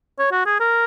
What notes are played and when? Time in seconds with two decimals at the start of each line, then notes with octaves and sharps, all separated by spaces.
0.19 C#5
0.32 F#4
0.46 G#4
0.60 A#4